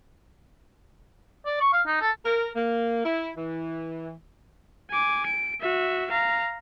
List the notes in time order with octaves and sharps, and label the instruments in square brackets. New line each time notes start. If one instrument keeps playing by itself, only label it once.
[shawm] D5
C#6
F5
D#4
A4
[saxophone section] A#4
A#3
E4
E3
[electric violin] G#5 D6
D7
F#4 E5
F5 A#5